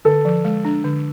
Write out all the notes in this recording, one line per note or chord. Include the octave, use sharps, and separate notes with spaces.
D3 A4
F3
G#3
D4
D3